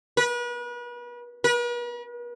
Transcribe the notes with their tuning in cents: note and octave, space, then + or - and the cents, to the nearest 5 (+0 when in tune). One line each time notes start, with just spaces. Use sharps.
B4 -35
B4 -45